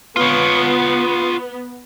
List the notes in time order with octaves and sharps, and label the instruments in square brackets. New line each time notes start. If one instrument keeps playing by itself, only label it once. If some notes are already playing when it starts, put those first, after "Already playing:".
[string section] B3 [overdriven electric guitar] F4 C#5